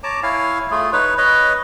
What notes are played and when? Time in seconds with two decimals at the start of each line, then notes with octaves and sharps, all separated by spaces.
0.03 C#5 A5 A#5 D6
0.23 E4 C#5 F5 G#5
0.71 A3 F4 G#4
0.93 D#4 B4 C#5
1.18 B4 C#5 D#5